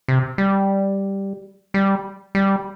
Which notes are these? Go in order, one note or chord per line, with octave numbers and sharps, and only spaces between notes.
C3
G3
G3
G3